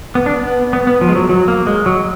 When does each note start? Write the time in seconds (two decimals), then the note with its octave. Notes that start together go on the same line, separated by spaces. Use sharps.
0.15 B3
0.26 D4
0.36 B3
0.73 B3
0.87 B3
1.01 F3
1.09 G#3
1.15 F#3
1.29 F#3
1.48 A#3
1.67 G#3
1.86 F#3